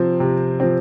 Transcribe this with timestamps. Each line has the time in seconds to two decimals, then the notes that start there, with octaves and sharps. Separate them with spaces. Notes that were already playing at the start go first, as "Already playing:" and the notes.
Already playing: C3 F3 C4
0.20 C3
0.60 F3 C4